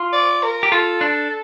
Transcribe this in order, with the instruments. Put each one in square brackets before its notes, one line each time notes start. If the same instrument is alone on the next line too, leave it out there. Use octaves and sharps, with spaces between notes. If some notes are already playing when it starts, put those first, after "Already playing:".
Already playing: [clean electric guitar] F4
[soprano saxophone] D5
A#4
[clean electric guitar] G4
[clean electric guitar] F4 [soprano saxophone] A4
[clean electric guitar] D4